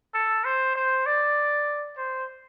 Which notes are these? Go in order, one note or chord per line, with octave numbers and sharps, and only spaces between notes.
A4
C5
C5
D5
C5